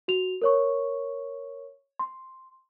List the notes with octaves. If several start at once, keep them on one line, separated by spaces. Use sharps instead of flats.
F#4 F7
A#4 C#5 C#6
C6